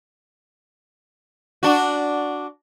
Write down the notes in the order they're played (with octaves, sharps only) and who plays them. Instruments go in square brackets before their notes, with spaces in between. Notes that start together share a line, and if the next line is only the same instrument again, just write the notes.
[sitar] D4 F#4